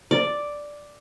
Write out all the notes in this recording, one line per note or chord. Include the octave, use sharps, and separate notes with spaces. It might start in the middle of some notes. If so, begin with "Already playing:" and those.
D5